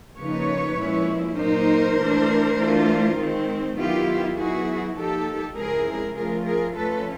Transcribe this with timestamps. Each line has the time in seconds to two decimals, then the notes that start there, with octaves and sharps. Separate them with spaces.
0.18 C#3 F3 A#3 D#4 B4 C#5
0.78 A#2 F3 G#3 C#4 E4
1.37 A#2 F#3 A#3 D#4 A#4 C5
1.97 E3 A3 D4
2.57 E3 A3 D4 F4
3.17 D#3 G#3 C4
3.76 D#3 F#3 B3 E4 F4 G4
4.36 F#3 B3 E4 F#4 G#4
4.96 F3 A#3 D#4 G4 A4
5.56 C#3 F3 G#3 C4 E4 G#4 A#4
6.15 F3 A3 C#4 F4 G#4 A#4
6.45 G#4 A#4
6.75 F3 A3 C#4 F4 A4 B4